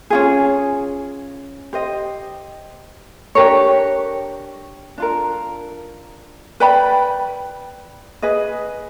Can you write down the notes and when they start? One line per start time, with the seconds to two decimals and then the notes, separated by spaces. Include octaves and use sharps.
0.10 C#4 F4 G#4
1.73 G4 C5 D#5
3.35 D4 G4 A#4 C#5
4.98 D4 F4 A#4
6.60 B4 D5 G5 B5
8.22 G#4 B4 D#5